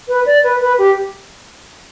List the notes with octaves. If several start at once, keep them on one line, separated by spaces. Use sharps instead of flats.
B4
D5
B4
B4
G4